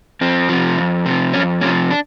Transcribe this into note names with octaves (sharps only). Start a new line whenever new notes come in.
F2 C4
C3 F3
F2
C3 F3
F2 C#4
C3 F3 C#4
D4